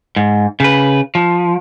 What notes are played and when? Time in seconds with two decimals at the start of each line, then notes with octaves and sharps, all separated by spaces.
0.16 G#2
0.60 C#3 B4
1.15 F3